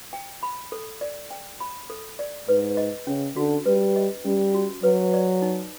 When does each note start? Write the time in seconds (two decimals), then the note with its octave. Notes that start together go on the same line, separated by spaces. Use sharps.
0.13 G5
0.43 B5
0.72 A4
1.01 D5
1.31 G5
1.60 B5
1.90 A4
2.19 D5
2.48 G#2 B4
2.77 D#5
3.07 C#3 C#4
3.36 D3 F#4
3.66 G3 B4
3.96 D#5
4.24 G3 C#4
4.54 F#4
4.83 F#3 B4
5.14 D5
5.42 D#4